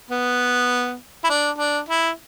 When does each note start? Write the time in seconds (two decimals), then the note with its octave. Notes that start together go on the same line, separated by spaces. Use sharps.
0.10 B3
1.24 E4
1.30 D4
1.58 D4
1.89 E4